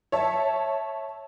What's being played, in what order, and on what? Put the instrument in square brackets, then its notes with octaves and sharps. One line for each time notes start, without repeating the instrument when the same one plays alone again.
[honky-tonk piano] C#5 E5 A5